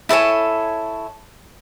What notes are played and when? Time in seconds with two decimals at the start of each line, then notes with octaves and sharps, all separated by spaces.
0.09 E4 A4 C#5 G#5